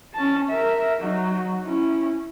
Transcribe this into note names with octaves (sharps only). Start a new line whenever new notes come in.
C#4 A5
A#4 E5
F#3 D#4
C#4 E4